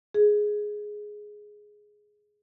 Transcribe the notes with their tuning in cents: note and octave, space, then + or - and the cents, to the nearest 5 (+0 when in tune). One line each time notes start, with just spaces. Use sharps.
G#4 +5